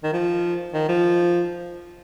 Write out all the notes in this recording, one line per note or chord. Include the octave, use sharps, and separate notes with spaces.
D#3
F3
D#3
F3